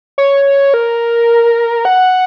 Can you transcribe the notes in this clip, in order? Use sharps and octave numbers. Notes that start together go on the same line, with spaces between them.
C#5
A#4
F#5